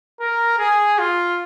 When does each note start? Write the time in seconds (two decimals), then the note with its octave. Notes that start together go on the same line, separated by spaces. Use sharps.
0.21 A#4
0.59 G#4
0.99 F4